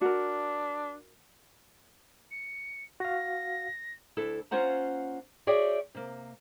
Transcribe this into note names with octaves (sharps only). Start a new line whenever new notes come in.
D4 F#4 A#4
C#7
F#4 F5 A#6
D2 E4 A4
A#3 C#4 F4 C5 F#5 A#5
F#4 G#4 C#5 D5 E5 G5
C3 A#3